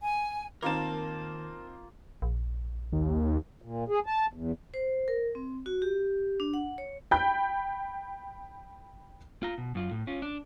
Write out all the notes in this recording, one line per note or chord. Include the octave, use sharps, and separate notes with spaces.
G#5
D#2 A#3 C4 D#4 F4 A#4 F5 A5
A#1
D#2
A#2
G#4
A5
E2
C5
A#4
C4
F#4
G4
D4
F#5
C#5
G5 B5 G6
F4 A#5
B2
F#2 F4
A2
C#4 F4
D4